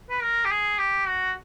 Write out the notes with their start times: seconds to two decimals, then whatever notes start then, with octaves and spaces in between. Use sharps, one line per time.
0.09 B4
0.22 A#4
0.44 G4
0.50 G#4
0.78 G4
1.07 F#4